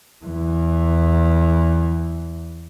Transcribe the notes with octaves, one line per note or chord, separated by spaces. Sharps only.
E2 E3